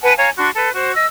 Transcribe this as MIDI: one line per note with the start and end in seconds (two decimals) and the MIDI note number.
0.02 0.14 71
0.02 0.14 78
0.02 0.14 80
0.02 0.14 81
0.17 0.30 73
0.17 0.30 77
0.17 0.30 80
0.17 0.30 82
0.38 0.50 62
0.38 0.50 66
0.38 0.50 84
0.56 0.72 69
0.56 0.72 71
0.74 0.93 66
0.74 0.93 72
0.95 1.07 75
0.95 1.07 88